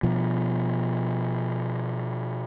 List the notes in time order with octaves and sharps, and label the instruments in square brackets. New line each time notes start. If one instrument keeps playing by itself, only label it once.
[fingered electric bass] B2 F3